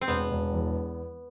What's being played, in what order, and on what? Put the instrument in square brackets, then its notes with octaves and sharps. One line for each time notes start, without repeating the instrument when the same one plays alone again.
[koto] C4
[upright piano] E1 [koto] B3
[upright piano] E1
E2